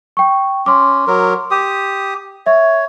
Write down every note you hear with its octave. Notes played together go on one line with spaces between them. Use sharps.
G5 C#6
C#4 C6 D6
F#3 A#4
G4 D#6
C#5 E5